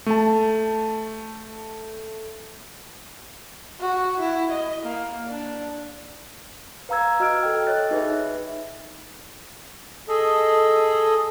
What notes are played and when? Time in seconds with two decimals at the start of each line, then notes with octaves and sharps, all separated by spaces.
0.06 A3 A5
3.80 F#4
4.19 E4
4.51 D#5
4.83 A#3
5.27 D4
6.89 B4 F5 A#5 E6 G#6
7.20 F#4 D#5 E6 F6 G#6 D7
7.43 A4 G5
7.67 C#5 D#5 F#6 A6
7.91 D#4 G#4 B4 E5
10.09 G#4 A4 D#5